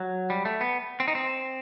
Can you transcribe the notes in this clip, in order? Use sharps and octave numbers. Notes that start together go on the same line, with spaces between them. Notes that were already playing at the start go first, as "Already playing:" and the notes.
Already playing: F#3
G3
A3
B3
C4
D#4
C4